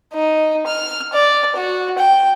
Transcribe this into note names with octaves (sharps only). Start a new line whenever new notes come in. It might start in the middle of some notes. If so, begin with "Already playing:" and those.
D#4
F6
D5
F#4
G5